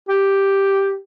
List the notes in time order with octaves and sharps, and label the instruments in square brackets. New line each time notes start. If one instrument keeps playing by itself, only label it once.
[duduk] G4